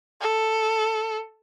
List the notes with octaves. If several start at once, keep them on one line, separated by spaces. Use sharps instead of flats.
A4